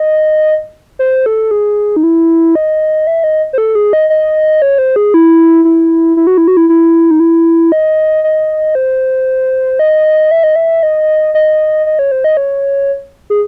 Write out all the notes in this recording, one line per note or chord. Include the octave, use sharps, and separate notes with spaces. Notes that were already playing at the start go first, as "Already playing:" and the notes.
Already playing: D#5
C5
A4
G#4
D#4
E4
D#5
E5
D#5
C5
A4
G#4
D#5
D#5
C#5
C5
G#4
E4
E4
E4
F#4
E4
F#4
E4
E4
D#4
E4
D#5
D#5
C5
D#5
E5
D#5
E5
D#5
D#5
D#5
C#5
C5
D#5
C#5
G#4